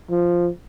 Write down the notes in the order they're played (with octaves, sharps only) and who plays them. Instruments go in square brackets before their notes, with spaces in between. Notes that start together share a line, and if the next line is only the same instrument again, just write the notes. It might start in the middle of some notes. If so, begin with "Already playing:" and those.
[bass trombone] F3